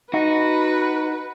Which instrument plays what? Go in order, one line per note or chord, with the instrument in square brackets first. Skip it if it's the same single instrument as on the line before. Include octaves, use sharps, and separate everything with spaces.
[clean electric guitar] D#4 [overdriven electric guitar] F#4 [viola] B4